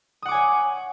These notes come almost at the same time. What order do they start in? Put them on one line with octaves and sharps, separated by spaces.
D#6 F#5 D6 G#5 C#5